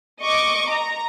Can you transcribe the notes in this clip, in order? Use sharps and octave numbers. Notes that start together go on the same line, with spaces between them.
D#5 C#6 D6
A#5